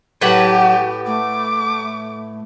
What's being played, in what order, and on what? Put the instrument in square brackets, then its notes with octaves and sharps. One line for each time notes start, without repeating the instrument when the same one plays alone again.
[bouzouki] A2 B4 F#5 [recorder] F#3 [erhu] G4
[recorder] A3 [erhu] D6